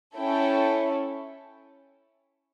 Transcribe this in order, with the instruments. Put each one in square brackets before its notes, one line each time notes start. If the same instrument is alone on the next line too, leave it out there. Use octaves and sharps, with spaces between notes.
[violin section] C#4 E4 A4 G5